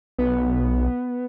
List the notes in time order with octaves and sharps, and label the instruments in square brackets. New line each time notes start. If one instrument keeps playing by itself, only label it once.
[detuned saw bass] B1 [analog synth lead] B3